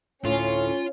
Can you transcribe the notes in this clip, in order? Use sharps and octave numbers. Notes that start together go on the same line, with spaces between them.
D2 A2 C#4 F4